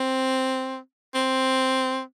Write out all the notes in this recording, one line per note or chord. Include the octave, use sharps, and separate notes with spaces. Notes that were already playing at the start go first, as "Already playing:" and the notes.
Already playing: C4
C4